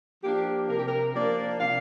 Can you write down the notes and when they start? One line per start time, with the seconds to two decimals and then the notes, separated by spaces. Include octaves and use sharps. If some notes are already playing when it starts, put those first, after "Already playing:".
0.24 F3 A#3 D4 G4
0.69 C3 A#4
0.78 G4
0.87 A#4
1.14 F3 A#3 D4 D5
1.59 C3 F5